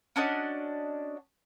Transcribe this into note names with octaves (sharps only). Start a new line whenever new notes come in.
C#4 D4 F#4 D#5